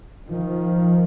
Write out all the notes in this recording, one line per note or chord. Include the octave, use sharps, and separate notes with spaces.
D#3 F3